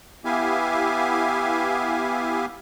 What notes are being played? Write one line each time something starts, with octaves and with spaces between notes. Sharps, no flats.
B3 E4 G4 E5 F5 G#5